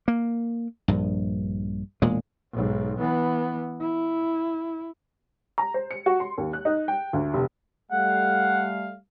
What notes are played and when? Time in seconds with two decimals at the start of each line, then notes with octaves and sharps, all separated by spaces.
0.08 A#3
0.88 A#1 G2
2.02 E1 A#2 G#3
2.53 B1 G#2
2.99 E3 B3
3.80 E4
5.58 A#5
5.74 C5
5.91 C#7
6.06 F#4
6.20 C6
6.38 D#2
6.53 F#6
6.65 D#4
6.88 G5
7.13 D2
7.33 F1
7.91 G3 A3 F5 F#5